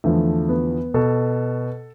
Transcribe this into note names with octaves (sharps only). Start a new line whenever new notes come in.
E2 D3 F3 A3
B3
B2 A4